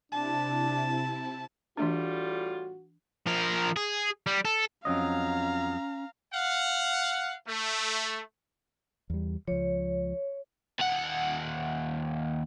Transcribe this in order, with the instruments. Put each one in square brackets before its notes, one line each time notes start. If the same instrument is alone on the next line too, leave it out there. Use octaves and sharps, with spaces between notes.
[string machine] C3 E4 [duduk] D4 [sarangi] A5
[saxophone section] A2 G3 F4 [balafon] E3 A3 D4 [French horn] F#4
[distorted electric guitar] F3 A#4
G#4
G3
A4
[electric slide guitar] F2 F#3 D#5 [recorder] C#4 [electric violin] F5 A#5
[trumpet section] F5 F#5
A3
[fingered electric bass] E2 G3
[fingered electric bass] C#2 F3 [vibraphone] C#5
[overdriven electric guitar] D#2 F#5